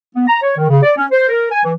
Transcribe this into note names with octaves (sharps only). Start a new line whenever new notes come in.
B3
A#5
C#5
D#3
C#3
D5
C#4
C5
A#4
G#5
E3